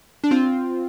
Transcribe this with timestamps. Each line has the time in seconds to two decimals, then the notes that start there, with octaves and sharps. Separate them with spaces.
0.24 D4
0.31 C4 F4